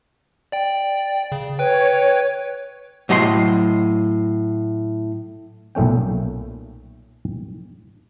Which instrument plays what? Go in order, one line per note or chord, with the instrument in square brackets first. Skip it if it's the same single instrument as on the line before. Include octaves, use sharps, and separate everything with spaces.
[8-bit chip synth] D5 G5
C#3
[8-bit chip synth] B4 G5 [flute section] C#5
[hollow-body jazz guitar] A2 F#3 D#5 A5 C6
[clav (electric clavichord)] B1 A#2 A3 C#4 G5